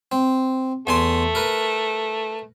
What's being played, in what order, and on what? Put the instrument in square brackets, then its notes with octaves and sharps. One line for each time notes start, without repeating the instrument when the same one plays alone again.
[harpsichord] C4
[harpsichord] E2 G#5 C6 [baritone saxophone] A3
[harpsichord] A#4 B4